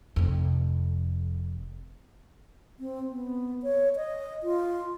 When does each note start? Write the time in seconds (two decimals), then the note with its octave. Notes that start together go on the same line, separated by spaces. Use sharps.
0.16 F1 F2
2.79 C4
3.10 B3
3.63 C#5
3.96 D#5
4.43 F4